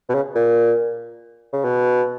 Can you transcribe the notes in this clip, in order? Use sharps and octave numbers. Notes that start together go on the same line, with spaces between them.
B2
C#3
A#2
C#3
B2